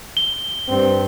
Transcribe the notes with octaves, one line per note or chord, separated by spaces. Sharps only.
G7
G2 C4